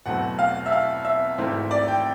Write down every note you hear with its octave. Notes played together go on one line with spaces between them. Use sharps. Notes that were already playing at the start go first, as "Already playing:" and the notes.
E2 B2 F#3 A3 C4 F#5
F5
E5
F5
E5
G#1 G#2 E3 A3 C4
D5
G5